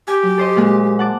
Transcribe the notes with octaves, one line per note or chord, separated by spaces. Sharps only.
G4 G#5
F#3
A4 C5 D#5
A#2 G#3
F#5 A5 D6